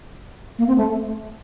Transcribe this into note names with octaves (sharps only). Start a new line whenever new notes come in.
A#3
C4
A3